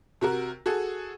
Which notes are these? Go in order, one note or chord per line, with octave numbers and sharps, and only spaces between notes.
C3 F#4 A#4
F#4 G#4 A4